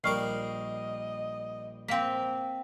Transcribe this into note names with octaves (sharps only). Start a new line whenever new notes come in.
A#1 G3 A#4 D#5 C#6 F6 C7
A#3 C4 F5 B6